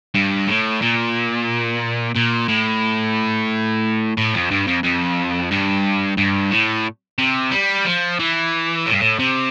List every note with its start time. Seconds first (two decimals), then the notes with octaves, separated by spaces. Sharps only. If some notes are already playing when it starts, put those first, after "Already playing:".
0.15 G2
0.48 A2
0.82 A#2
2.16 A#2
2.49 A2
4.17 A2
4.34 F2
4.51 G2
4.67 F2
4.83 F2
5.51 G2
6.17 G2
6.51 A2
7.18 C3
7.51 G3
7.85 F3
8.19 E3
8.86 A2
8.93 G2
9.00 A2
9.19 C3